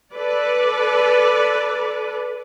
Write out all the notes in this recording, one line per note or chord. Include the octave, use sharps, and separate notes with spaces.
A4 B4 D5